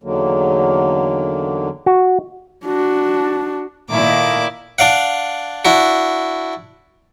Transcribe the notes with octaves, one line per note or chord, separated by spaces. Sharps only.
E2 D3 D#3 F#3 A#3
F#4
D4 F#4
A#2 D#3 A3 E4 D6
D4 D5 F5 F#5
D4 E4 F#4